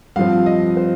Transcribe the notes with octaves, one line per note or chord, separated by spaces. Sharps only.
G2 F3 C4 F5
D#5
C5